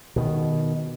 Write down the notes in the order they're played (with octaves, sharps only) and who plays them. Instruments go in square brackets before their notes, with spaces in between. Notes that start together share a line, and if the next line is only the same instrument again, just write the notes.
[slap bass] B2 D#3